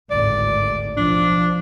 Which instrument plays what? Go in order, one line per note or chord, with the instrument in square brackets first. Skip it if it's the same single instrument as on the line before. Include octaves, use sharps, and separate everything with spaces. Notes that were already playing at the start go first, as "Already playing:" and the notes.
[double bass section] G#1 D2 A2 [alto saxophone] D5
[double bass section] B1 F3 [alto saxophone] D4